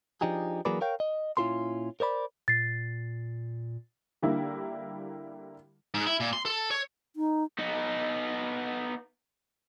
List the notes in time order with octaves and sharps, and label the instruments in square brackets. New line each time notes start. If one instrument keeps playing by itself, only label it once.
[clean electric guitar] F3 D4 D#4 G4 G#4
E3 F#3 A#3 G#4 B4 D5
A#4 C#5 F5 G5
D#5
A#2 C#4 E4 F4 A#4 C6
A#4 C5 D5 B5
[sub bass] A#2 [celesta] A6 C7
[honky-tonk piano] D3 G3 A#3 E4
[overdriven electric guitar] G#2
E4
A#2
C6
A4
C#5
[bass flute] D#4
[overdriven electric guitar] B3 D#4